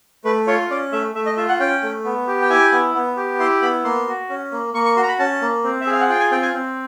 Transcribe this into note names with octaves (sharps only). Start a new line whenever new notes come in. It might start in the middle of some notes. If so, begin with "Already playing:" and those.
A3 B4
F4 C#5
C#4 D5
A3 E5
A3 E5
D#5
F4 E5
F#5
C#4 G5
A3
B3
G4
G5
E4 G#5
B3
B3
G4
E4 C6
B3 B5
A#3 C6
F#4
C#4
A#3
A#3 C#6
C#6
F#4 C6
A#5
B5
C#4 A5
A#3
C4
E5
G#4 F5
F#5
F4 G5
G#5
C4 G5
G#5
C4